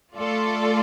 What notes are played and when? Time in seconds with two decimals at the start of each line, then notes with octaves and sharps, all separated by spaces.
0.15 A3 F4 A4 D5